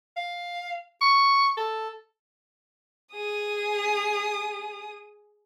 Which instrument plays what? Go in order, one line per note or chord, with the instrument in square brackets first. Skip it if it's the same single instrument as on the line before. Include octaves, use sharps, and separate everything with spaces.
[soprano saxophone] F5
C#6
A4
[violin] G#4 D#6